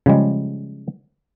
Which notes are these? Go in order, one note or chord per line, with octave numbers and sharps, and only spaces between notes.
C#3 F3 G3 G#3